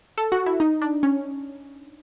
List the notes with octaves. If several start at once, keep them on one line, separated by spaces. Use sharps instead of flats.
A4
F#4
E4
D#4
D4
C#4